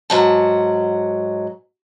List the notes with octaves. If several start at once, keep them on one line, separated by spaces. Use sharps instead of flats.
G#2 F#3 A5